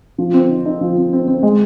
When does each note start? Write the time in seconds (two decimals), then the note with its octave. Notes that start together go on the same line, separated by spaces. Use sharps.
0.18 F3
0.34 C4
0.50 D#4
0.65 D#4
0.81 F3
0.97 C4
1.13 C4
1.28 C4
1.43 G#3